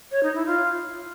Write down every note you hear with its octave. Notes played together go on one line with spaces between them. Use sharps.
C#5
D#4
E4
F4